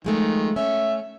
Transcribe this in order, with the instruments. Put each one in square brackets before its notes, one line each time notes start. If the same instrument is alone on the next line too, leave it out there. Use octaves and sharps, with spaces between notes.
[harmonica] D#3 [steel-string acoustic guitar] F3 G#3 A3
[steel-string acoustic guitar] A3 C#4 [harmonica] E5